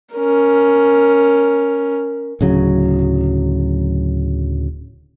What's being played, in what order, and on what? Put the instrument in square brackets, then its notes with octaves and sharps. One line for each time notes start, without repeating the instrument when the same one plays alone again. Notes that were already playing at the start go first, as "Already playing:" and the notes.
[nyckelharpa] C#4 A#4
[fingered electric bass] D1 C#3 F#3